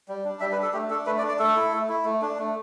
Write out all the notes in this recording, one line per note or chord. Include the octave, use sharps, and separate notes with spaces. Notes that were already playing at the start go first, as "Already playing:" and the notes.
G3
D4
G3 E5
B4
D4
A4
A3 G4
D4 A4
A3 B4
D5
D4
D5
A3 A4
E4
A3
E4
A3
D4
A3